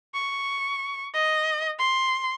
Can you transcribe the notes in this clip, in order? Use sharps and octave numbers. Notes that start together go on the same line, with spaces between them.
C#6
D#5
C6